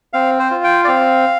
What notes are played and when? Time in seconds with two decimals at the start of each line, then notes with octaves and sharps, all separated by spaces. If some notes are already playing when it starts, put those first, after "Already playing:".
0.13 C4 F5
0.39 C5
0.51 F4
0.64 G5
0.85 D5
0.88 C4 F5